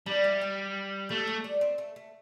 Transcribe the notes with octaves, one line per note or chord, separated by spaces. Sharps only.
G3 D4
E4
G4
A3 G4
G4
D4
C4
A3
A3